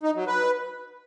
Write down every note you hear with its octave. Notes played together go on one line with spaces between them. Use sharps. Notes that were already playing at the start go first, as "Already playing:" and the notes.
D#4
F#3
B4